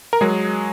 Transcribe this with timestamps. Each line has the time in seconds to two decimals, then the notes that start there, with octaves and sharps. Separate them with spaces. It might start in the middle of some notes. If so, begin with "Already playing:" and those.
0.13 A#4
0.21 F#3 G#3 G#4